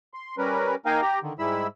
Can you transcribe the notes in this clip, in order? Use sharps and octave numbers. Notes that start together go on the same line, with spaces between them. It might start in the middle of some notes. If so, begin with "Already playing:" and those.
C6
G3 C#4 A#4 B4
A#3 D#4 A#4 F5 G5 G#5
G4 G5 A#5
D3 D#3
G#2 G3 G#3 E4 B5 E6